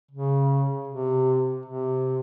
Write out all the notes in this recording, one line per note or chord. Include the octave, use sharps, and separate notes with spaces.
C#3
C3
C3